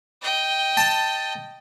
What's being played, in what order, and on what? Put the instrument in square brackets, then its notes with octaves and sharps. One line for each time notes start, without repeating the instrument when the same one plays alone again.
[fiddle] D#5 G5
[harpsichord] A5